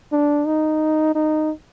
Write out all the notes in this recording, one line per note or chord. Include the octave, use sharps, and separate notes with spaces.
D4
D#4
D#4